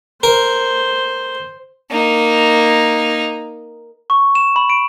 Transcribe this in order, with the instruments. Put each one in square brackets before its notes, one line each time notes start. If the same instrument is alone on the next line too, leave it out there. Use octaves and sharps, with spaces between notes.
[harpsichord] A#4 [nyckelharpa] C5
[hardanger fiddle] A#3 D#4
[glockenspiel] C#6
E7
B5
D7